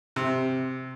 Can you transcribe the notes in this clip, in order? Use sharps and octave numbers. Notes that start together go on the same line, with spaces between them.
C3